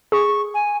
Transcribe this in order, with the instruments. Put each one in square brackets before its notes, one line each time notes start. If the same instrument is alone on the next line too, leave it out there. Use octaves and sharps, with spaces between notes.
[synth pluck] G#4 [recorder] C#6
[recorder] G#5